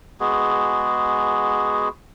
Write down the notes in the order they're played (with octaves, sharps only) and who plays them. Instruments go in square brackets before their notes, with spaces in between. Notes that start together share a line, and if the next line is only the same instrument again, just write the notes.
[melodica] G#3 B3 F#4 G#4